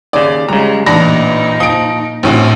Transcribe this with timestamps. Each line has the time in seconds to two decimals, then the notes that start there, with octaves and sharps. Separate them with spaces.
0.13 D#2 C#3 D5
0.49 C#2 C#3 G3 G#3 A#5
0.86 A1 A#2 D4 D#4 B5 A#6
1.60 F3 D#6 D7
2.23 A#1 A2 D3 C4 C#4 F#4